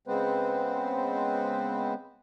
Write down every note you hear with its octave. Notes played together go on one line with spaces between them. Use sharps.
C#3 G#3 B3 C4 B4 C5